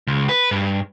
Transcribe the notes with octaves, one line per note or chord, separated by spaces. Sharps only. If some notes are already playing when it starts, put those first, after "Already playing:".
C#2
B4
G2